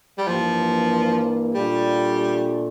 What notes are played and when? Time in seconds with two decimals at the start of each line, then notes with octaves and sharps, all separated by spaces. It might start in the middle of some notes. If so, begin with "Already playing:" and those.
0.18 G3
0.27 G2 E3 F3 A#3
1.54 A#2 G3 A3 D4 F4